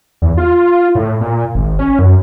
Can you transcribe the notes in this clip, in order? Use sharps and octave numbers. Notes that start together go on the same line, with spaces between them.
E2
F4
A2
A#2
G#1
C#4
F#2